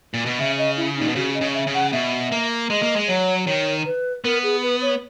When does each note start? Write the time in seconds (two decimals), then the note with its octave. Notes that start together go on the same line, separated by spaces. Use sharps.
0.14 A#2
0.26 B2
0.39 C#3 E5
0.58 D#5
0.77 E4
0.97 A#2 D#4
1.08 B2
1.16 C#3 F#4
1.34 D#5
1.41 C#3
1.54 E5
1.67 C#3
1.74 F#5
1.93 B2 E5
2.32 A#3
2.70 G#3 D#5
2.82 A#3
2.96 G#3
3.08 F#3 C#5
3.47 D#3 C#5
3.86 B4
4.25 B3 A#4
4.43 G#4
4.63 B4
4.82 C#5